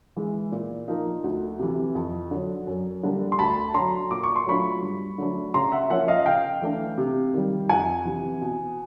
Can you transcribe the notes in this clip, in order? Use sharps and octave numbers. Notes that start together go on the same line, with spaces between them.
E3 G#3
A#2
F3 A#3 D#4
D2
C3 E3
F2
D3 F#3
F#2
D3 G3 A#3 D4
C6
D2 A5 B5
D3 F#3 A#5 C6
A#2 D6
C#6
C6
F#3 A3 D4 F4 B5 C#6
G2
D3 F#3 A3 D4
C#3 A#5 C6
E5 F#5
F3 A#3 C#4 F4 E5 F#5
D#5 F5
C#3 F5 G5
E3 A3 D4
C3
D#3 G3
F2 F#5 G#5
C3 E3
B2